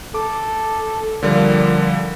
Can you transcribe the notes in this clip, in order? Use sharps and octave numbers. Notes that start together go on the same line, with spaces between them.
A4 D6
A#2 D3 F3 G3